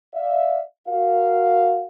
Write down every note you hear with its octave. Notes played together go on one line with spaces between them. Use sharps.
D5 E5 F5
F#4 A#4 F5